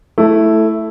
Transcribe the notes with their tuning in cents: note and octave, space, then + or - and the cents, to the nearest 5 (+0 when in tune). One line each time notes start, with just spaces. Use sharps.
A3 +0 E4 +0